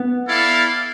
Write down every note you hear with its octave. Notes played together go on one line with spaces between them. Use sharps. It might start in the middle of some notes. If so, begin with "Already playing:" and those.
Already playing: B3
E4 A4 D5 F5